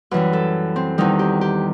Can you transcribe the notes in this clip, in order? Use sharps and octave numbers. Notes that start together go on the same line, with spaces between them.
F#2 E3 G3 B4
A4
C4
E2 D#3 G3 D#4
G4
G4